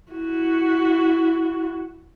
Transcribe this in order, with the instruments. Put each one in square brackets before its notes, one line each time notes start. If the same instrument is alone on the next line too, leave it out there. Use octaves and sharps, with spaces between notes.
[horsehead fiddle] E4 F#4